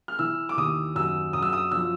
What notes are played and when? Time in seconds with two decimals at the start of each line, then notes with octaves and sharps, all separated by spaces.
0.08 F6
0.19 E3 E6
0.49 D6
0.57 D#2 D#6
0.95 F#2 E6
1.33 F#2 D#6
1.42 E6
1.53 D#6
1.71 F3 E6